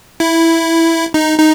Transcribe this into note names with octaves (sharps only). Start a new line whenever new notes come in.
E4
D#4
D#4